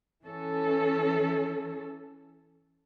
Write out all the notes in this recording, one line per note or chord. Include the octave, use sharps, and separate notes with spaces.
E3 C#4 A4